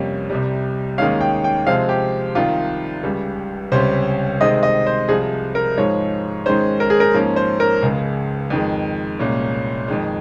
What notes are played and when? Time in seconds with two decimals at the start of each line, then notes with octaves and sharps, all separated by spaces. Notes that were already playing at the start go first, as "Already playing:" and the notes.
Already playing: F2 C3 G3 A#3 C#4
0.30 C2 C3 G3
0.98 D#2 D#3 G#3 C#4 F5
1.21 G5
1.44 G5
1.67 C3 F3 G#3 C4 F5
1.89 G4
2.35 C2 C3 D#3 F4
3.03 C#2 C#3 G3
3.72 C#2 C3 G3 C#4 C5
4.41 C3 D#3 G#3 C4 D#5
4.63 D#5
4.87 C5
5.08 C2 C3 F3 G#4
5.55 A#4
5.77 G#2 F3 G#3 C#5
6.46 G#2 D#3 G#3 C#4 C5
6.80 A#4
6.90 G#4
7.00 A#4
7.14 G#2 F3 A#3 C#4
7.36 C5
7.60 A#4
7.82 C#2 C#3 G#3
8.50 F2 D#3 G#3
9.19 C2 A#2 G#3 C#4
9.88 F2 D#3 G#3